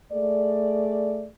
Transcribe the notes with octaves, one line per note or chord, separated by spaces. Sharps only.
A3 G#4 D5